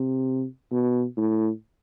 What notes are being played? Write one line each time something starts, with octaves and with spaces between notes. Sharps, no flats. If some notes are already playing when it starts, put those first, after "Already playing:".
Already playing: C3
B2
A2